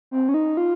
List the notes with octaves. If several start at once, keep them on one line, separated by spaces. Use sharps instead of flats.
C4
C#4
D#4
F4